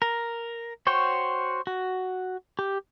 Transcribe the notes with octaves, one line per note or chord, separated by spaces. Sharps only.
A#4
F#4 C5 C#5 G5
F#4
G4